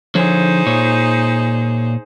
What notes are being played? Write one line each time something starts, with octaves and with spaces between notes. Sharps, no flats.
D3 F3 D#4 G#4 C5 C#5
A#2 C#5